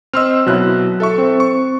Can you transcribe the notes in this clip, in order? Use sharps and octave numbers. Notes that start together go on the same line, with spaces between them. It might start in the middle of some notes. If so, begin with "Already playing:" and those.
C4 D#5 C6 E6 F6
B2 F#3 E4 F#6
A4 E5 C#6
C4
C#6